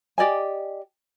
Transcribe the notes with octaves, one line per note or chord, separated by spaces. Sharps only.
G4 D5 D#5 G#5